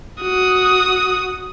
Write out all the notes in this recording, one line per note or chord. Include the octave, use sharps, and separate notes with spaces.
F#4 D#6